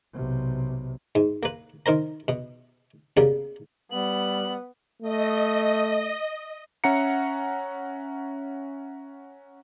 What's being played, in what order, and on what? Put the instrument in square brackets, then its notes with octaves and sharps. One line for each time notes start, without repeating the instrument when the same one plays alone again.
[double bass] B1 C3
[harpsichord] G#2
A#3 B4
D#3 A#4 C5 A#5
B2
C#3 G3 A#3 B3
[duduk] G3 [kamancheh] B3 [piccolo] F#7
[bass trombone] A3 [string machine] D#5
[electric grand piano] C#4 E5 F#5 A#5 C#7